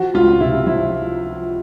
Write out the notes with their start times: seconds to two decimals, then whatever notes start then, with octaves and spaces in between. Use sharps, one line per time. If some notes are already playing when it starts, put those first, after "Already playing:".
Already playing: F3 F#4
0.14 C#2 F4
0.40 C3 E4
0.66 F3 E4